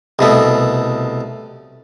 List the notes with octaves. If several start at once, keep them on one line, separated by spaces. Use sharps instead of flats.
C2 B2 A3